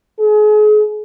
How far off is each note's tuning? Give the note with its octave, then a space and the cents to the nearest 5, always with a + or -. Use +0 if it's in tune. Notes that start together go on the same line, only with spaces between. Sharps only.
G#4 +35